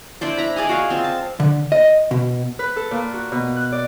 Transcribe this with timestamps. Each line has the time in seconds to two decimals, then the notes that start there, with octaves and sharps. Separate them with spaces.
0.21 D4 E4 C5 D5
0.37 E4 A#5 B5
0.56 G#4 D5 D#5 G#5
0.69 F#4 G#4 F5
0.90 C4 F4
1.04 A5
1.40 D3
1.72 D#5
2.11 B2
2.59 B4
2.76 A4
2.91 A#2
3.14 F#4
3.32 B2
3.56 F#6
3.72 D5